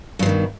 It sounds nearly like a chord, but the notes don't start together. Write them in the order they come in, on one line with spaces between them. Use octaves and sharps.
G2 F3 D#3 B2